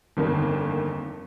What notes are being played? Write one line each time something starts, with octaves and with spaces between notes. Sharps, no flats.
G1 F2 D3 D#3 A#3